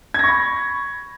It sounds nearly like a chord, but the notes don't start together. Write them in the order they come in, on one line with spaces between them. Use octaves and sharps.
G#6 A#6 C#6 B5